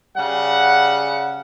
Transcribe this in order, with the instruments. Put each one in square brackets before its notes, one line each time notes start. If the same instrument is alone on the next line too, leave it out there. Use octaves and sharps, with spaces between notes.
[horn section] C#3 G3 F#5